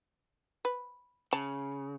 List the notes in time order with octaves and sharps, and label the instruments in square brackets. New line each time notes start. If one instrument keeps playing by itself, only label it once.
[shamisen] B4
[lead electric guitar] C#3 [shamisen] A5